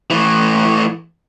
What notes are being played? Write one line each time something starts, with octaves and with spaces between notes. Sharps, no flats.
A2 E3